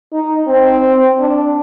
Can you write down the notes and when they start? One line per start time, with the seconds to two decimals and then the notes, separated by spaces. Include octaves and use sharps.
0.13 D#4
0.47 C4
1.19 D4